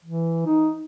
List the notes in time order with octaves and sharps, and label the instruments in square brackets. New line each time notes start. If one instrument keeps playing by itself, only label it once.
[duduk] E3
D#4